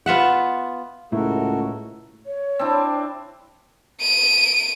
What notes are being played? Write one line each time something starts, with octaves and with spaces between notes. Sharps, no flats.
B3 F4 E5 F#5
C#2 A2 E4 F#4 A4 A#4
C#5
C4 D4 E4
D7 D#7